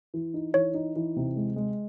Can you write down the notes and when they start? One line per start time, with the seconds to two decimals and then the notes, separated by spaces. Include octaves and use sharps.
0.14 E3
0.34 D#4
0.54 E3 C#5
0.74 D#4
0.96 E3
1.16 C3
1.36 G#3
1.56 G#3